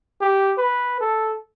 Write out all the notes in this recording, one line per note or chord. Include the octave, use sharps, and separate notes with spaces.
G4
B4
A4